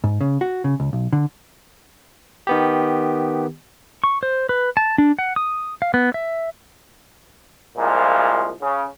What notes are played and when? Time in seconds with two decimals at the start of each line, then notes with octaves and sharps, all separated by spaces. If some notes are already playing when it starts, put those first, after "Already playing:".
0.04 G#2
0.21 C#3
0.41 F#4
0.64 C#3
0.80 C#2
0.93 B1
1.13 D3
2.47 D#3 B3 G4
4.04 C#6
4.23 C5
4.49 B4
4.77 A5
4.98 D4
5.19 F#5
5.36 D#6
5.82 F5
5.94 B3
6.14 E5
7.78 C2 A#2 F3 G#3
8.61 C#3